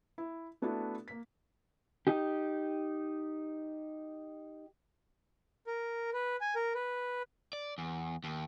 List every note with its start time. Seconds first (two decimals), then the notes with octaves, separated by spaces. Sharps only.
0.18 E4
0.62 A3 B3 D4 E4 F#4 A4
1.08 A#3 B6
2.07 D#4 G4
5.67 A#4
6.13 B4
6.41 G#5
6.55 A#4
6.75 B4
7.53 D5
7.78 E2
8.24 D#2